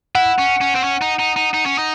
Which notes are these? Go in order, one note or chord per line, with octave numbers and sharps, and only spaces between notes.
E4 F#5
C#4
C#4
C4
C#4
D#4
D#4
D#4
D#4
C#4
D#4